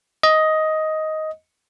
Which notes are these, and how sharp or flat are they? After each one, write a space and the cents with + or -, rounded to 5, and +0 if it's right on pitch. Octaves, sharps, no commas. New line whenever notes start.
D#5 +10